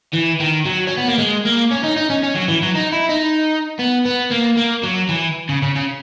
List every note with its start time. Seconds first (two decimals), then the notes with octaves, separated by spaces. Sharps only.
0.14 E3
0.40 D#3
0.66 F#3
0.87 C#4
0.98 B3
1.08 A#3
1.18 G#3
1.45 A#3
1.71 C#4
1.83 D#4
1.96 D#4
2.10 C#4
2.23 C#4
2.35 F#3
2.48 E3
2.62 F#3
2.75 D#4
2.92 E4
3.09 D#4
3.79 B3
4.05 B3
4.31 A#3
4.57 A#3
4.83 F#3
5.09 E3
5.49 C#3
5.62 C#3
5.75 C#3